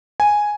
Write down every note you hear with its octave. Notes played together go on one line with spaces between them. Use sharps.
G#5